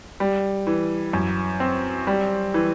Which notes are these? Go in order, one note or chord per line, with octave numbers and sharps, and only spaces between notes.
G3
E3
F#2
C4
G3
E3